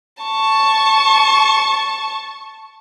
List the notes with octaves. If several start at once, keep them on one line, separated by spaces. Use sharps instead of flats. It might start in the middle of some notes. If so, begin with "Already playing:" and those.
A5 C#6